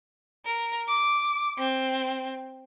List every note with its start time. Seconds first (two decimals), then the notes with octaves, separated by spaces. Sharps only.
0.46 A#4
0.88 D6
1.58 C4